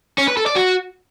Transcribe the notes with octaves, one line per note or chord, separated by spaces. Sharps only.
C#4
B4
A4
D5
F#4